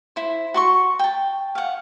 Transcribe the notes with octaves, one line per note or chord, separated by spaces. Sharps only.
E4 C5
F#4 C6 C#6
G5 A5
F5 F#5